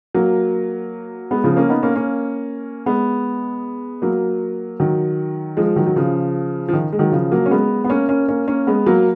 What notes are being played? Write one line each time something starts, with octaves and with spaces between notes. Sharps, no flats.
F#3 A#3
G#3 B3
C#3 F3
A#3 C#4
B3 D#4
A#3 C#4
A#3 C#4
G#3 B3
F#3 A#3
D#3 F#3
F3 G#3
D#3 F#3
F#3
C#3 F3
F3
D#3
G#3
D#3 F#3
C#3 F3
F#3 A#3
C#4
G#3 B3
B3
A#3 C#4
A#3 C#4
A#3 C#4
A#3 C#4
G#3 B3
F#3 A#3